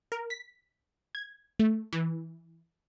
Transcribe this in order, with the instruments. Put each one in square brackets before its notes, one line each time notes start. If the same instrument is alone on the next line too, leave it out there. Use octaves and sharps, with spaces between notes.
[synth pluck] A#4
B6
G#6
A3
E3